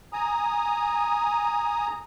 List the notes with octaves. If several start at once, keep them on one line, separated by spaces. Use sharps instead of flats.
G#5 A#5 D#6